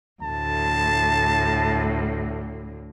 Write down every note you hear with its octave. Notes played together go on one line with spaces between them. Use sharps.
D2 A2 A5